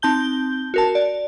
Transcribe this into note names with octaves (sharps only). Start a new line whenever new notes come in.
C4 D#4 A5 G6 G7
F#4 A#4 A5
D5